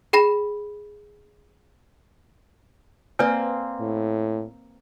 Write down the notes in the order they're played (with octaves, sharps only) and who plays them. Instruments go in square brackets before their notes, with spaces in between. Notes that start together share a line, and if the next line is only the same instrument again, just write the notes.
[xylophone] G#4 G5 B5 A#6 E7
[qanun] A#3 C4 C6 [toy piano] B4 D5 G#5
[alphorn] A2